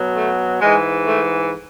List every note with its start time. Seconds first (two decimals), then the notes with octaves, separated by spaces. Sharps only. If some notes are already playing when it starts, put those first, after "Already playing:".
Already playing: B2 F#3
0.16 A3
0.61 G#2 E3 G#3
1.07 A3